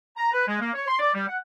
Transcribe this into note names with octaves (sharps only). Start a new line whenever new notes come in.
A#5
B4
G#3
A#3
C#5
C6
D5
G3
F#5